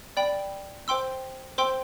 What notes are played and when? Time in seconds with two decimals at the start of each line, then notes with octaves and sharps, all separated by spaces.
0.17 D5 G5 B5
0.88 C5 G5 C6 E6
1.58 C5 G5 C6 E6